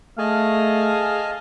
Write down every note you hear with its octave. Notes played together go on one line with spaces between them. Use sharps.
A3 G#4 D#5 F5 G#5 A5